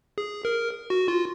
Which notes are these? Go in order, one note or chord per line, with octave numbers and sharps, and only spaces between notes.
G#4
A#4
F#4
F4